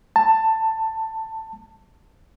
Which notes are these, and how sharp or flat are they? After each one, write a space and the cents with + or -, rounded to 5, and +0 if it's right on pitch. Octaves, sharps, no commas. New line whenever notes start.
A5 +15